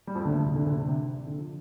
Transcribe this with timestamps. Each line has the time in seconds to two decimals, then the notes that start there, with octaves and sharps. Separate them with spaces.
0.07 G3
0.15 F2 F3
0.25 D2 D3
0.35 D2 D3
0.46 C3
0.56 D2 D3
0.66 D2 D3
0.77 C3
0.87 C3
1.27 D3
1.38 F3